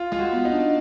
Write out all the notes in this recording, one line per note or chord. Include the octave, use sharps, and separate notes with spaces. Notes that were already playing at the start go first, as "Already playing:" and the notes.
Already playing: F4
G#3 F4
F#4
B3
D#4
D4